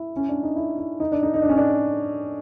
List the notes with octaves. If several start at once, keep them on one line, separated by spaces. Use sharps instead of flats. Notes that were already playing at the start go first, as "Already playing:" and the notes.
Already playing: E4
C#4
D4
D#4
E4
E4
D#4
D4
D#4
D#4
D4
C#4
D4